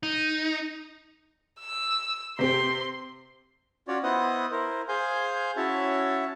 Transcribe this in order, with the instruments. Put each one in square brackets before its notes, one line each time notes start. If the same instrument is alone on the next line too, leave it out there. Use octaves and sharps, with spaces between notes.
[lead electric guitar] D#4
[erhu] E6
[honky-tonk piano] C3 C4 G4 [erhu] C6
[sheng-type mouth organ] C#4 F4 F#4 C#5 D5
B3 E4 C5 D#5 F#5 D#6
E4 A#4 C5
G#4 C5 F5 G#5 G6
C#4 E4 F#4 C#5 E5 A5